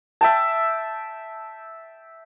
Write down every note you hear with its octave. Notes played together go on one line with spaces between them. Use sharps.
E5 G5 A5